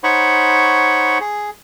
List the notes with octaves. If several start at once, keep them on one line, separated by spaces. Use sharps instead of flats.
D#4 C5 C#5 F#5 B5 C#6
G#4